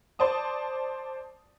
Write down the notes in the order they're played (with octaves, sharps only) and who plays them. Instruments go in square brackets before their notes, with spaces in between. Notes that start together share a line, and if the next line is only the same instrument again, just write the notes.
[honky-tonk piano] C5 D5 A5 D#6